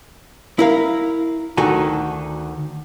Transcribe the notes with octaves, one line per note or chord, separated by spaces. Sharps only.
E4 A#4 F5
D2 D#3 F#4 A4 G#5